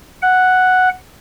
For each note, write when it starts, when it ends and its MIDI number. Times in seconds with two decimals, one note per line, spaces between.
0.22 0.89 78